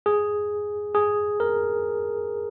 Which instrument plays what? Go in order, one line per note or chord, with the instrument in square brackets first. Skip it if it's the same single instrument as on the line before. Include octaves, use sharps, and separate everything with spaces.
[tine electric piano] G#4
G#4
A#4